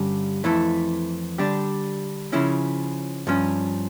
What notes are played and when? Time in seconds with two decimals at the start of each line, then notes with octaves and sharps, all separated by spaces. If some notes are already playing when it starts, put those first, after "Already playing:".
Already playing: G2 D3 G3 C#4
0.44 F2 E3 A3 E4 A4
1.38 D3 G3 D4 G4
2.32 C#3 F3 C#4 E4
3.27 G2 F3 C#4